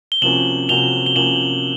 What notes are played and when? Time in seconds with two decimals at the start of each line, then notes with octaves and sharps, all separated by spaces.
0.12 G7
0.22 C3 F3 A#3 C#4 F#4 E7 F#7
0.69 C3 F3 A#3 C#4 F#4 F7 G7
1.06 G7
1.16 C3 F3 A#3 C#4 F#4 E7 F#7